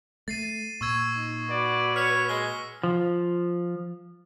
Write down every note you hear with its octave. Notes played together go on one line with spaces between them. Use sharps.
A3 A6 C7 D#7
A#2 C#6 E6 G#6
D#4
F#4 B4 D5
C#5 F6 B6 C#7
G#3 G7
F3